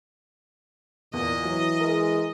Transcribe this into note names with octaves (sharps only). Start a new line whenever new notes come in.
E2 A#2 D#5
E3 F#3
G#3 A#4